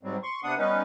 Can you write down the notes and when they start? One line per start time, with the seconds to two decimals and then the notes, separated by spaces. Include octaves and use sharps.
0.03 G#2 F#3 G3 C4
0.23 C6 C#6
0.44 C3 B3 D4 F#5 D#6
0.58 G3 B3 C#4 D#4 B4